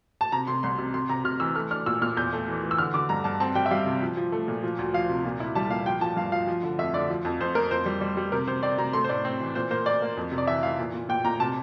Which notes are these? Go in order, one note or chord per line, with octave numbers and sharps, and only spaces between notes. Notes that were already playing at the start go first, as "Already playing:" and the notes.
A5
C3 A#5
C3 C6
C2 C6
C3
C3 C6
C3 A#5
C3 F6
E3 E6
A3 F6
D4 F6
A#2 E6
A#2 F6
E2 G6
A3
E3
E3
E6
D3 F6
D3 D6
G2 A#5
G2 A5
C4 A5
G3 G5
E5
G3 F5
C3
F3
F3
A3
A#2
F3
D2
F3 F5
C3
A#2
E4
G3 A5
A#2 F5
F3 G5
F3 A5
G2 F5
F3 F5
F3
D3
F2 E5
D3 D5
F3
F2
F2 C5
A#3 A#4
F2 C5
G3
G3
G3
C3 A#4
C3 C5
C4 D5
C3 A#5
A3 C6
C5
A2 D5
C4
E3
A#2 C5
A#3 C5
A#3 D5
A#3
F2
C3
D5
E3 E5
E3 F5
A#2
A#2
A#2 G5
A#2 A#5
C3 A5